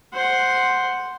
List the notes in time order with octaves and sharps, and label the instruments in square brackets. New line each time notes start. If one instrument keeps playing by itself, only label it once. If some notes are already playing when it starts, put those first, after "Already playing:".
[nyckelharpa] C5 F#5